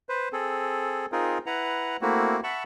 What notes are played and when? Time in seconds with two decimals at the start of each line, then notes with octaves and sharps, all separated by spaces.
0.09 B4 C5
0.33 C4 G#4 A4
1.12 C4 D#4 F4 G#4 A#4
1.46 E4 B4 F#5 A#5
2.02 A3 A#3 C4 E4 F#4
2.44 E5 F#5 A5 B5 C#6